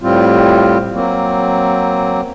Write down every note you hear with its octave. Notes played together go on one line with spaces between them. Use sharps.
A2 G3 C4 F4
F#3 A#3 C4